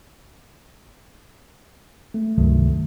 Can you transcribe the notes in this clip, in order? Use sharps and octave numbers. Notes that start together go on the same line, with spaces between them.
A3
C#2 G2 C3 D#3 F#3 A3